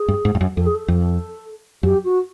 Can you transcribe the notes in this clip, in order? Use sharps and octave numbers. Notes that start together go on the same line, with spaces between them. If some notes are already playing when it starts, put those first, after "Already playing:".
Already playing: G#4
G2
G#2
G2
F#2
F2 A4
G#4
A4
F2
F#2 G4
F#4